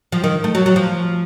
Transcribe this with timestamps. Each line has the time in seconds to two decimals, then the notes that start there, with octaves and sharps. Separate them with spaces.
0.12 F3
0.24 D#3
0.44 A3
0.55 F#3
0.66 F#3
0.76 F3